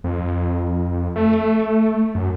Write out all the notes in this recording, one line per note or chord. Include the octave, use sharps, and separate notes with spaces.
F2
A3
F#2